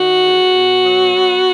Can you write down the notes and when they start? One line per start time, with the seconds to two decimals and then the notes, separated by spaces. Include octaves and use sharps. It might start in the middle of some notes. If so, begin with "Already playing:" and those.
Already playing: D#3 F#4
0.23 E2
0.53 B2
0.84 F#3
1.14 B3